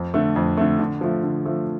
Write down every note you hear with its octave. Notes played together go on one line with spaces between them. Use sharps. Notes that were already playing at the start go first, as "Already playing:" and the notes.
Already playing: F2
D3 A3
F2
D3 A3
D3
F3 A3
D3
F3 A3